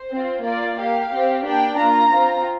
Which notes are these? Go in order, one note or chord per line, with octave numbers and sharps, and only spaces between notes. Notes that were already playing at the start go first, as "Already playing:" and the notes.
Already playing: C5
C4 F4
A#3 F4 D5
A#3 G4 F5
C4 G4
A#3 D4 G4 G5
A#3 F4 A#5
C4 F4